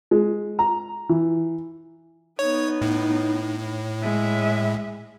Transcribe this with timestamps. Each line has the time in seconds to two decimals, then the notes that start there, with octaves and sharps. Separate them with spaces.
0.11 G#3
0.59 A#5
1.09 E3
2.39 B3 D#4 C#5
2.82 A2
4.02 G#3 E5